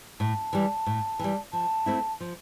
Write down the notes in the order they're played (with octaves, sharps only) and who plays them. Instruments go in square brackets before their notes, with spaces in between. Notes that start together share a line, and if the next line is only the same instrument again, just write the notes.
[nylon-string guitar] A2 [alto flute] A5
[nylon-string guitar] E3 G3
A2
E3 G3
[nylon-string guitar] F3 [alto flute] A5
[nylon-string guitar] A3 C4 E4
F3